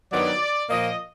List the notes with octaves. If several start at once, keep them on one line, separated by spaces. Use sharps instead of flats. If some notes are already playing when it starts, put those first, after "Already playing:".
G2 D#3 F#3 B3 D5
A#2 F3 A#3 D#5